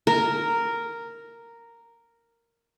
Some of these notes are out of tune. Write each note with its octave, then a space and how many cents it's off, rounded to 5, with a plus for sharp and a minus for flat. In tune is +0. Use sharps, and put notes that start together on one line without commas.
A#4 -5